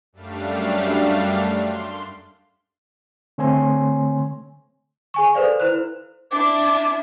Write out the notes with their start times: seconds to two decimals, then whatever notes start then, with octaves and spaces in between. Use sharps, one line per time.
0.13 F#2 G3 A3 D4 F5
1.54 C6
3.38 D3 A3 C4 C#5 G#5 C6
5.14 G#4 G#5 C#6
5.34 A4 B4 C5 D5 F5
5.60 E4 B4 C5 F#6
6.31 D4 E4 D6